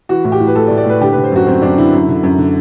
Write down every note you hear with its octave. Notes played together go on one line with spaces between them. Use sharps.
E3 F#4
A2
G4
A2
B4
A2 A4
D5
A2
D5
A2 B4
D3 G4
D3 B4
C5
F#2 F#4
F#2 C4
F#2 D4
D3 E4
F#2
D3
F#2
D3